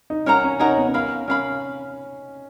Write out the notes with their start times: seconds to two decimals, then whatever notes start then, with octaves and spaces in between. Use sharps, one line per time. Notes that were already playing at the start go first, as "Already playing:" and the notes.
0.10 D#4
0.26 C#4 A#4 C#5 F#5 A#5
0.44 C#4
0.59 D#4 A#4 C#5 F#5 A#5
0.70 C#4
0.78 B3
0.87 C#4
0.94 A#4 F5 B5
1.28 C#4 A#4 F5 B5